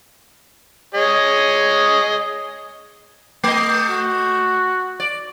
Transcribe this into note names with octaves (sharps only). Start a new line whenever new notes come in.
G#4 C#5 D#5
A3 D#5
F#4
D5